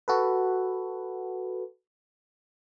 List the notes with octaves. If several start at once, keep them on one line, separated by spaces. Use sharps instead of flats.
F#4 A4 B4